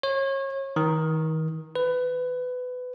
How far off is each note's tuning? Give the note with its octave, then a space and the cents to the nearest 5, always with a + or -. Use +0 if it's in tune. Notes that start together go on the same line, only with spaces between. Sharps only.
C#5 -30
D#3 +35
B4 +20